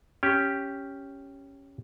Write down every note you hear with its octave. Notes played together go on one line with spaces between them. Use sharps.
C#4 G4